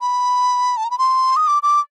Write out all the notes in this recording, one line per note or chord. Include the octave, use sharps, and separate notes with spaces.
B5
A5
A#5
B5
C6
D#6
D6
D6